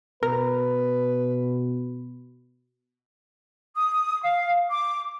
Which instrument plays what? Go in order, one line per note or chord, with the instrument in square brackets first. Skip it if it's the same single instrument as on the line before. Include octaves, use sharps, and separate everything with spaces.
[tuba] B2 [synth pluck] A#4 A#5 [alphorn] B4
[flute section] D#6
F5
D6